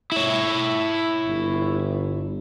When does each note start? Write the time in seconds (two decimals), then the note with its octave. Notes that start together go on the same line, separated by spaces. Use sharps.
0.12 E4 C#5
1.26 G1